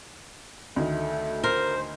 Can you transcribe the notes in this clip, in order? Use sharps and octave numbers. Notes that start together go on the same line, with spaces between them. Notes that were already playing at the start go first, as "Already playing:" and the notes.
D2 D#3 A3
A#4 C5